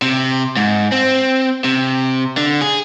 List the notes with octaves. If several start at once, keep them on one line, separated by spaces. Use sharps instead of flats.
C3
G#2
C4
C3
D3
G#4